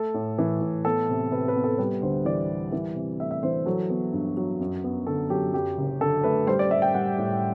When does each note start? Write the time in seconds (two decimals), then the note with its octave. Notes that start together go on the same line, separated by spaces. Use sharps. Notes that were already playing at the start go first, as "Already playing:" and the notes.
Already playing: A3 A4
0.14 A2
0.38 E3
0.61 A2
0.85 B3 A4
1.09 C3
1.32 C3 B4
1.48 B4
1.56 B3
1.64 A4
1.78 G3 B4
2.02 D2 C5
2.25 E3 D5
2.49 G3
2.72 E3
2.95 C3
3.20 A3 E5
3.31 E5
3.43 E3 C5
3.66 F#3 A4
3.90 B3
4.13 G2
4.37 F#3
4.60 F#2
4.84 B3
5.07 D3 A4
5.30 F#3 G4
5.54 F#2 G4
5.78 F#1
6.01 D3 A4
6.24 A3 B4
6.47 G3 C5
6.59 D5
6.70 G3 E5
6.82 G5
6.94 G3 F#5
7.18 A2